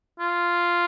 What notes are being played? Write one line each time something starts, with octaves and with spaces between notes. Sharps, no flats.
F4